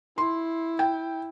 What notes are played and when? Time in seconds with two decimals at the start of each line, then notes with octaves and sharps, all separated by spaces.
0.18 E4 C6
0.79 G5